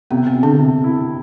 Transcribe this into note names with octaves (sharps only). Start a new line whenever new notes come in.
C3 B3
C4
C3
D3 D4
C3
E4